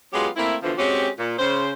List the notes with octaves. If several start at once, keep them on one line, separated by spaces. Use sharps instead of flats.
F#3 G#3 B3 C#4 F4 G4
A3 A#3 C4 E4
B2 D3 E3 F3
G#3 C4 C#4 F#4 G4
A#2
C#3 C5